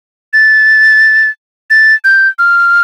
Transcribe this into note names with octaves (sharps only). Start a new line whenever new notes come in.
A6
A6
G6
F6